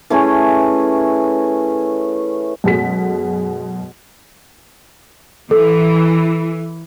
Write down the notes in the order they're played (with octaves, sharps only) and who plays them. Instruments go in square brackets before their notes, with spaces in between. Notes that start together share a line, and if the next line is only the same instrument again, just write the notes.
[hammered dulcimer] E3 A3 C#4 G#4
[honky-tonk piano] F#2 B2 G#3 A4 B6
[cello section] E3 [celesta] A4